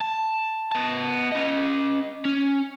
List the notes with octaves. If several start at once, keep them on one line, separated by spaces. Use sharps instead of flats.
A5
B3 A5
C#4 D#5
C#4